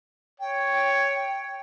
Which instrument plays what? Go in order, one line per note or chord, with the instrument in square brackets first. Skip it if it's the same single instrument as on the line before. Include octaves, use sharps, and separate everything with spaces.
[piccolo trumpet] C#5 [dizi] G5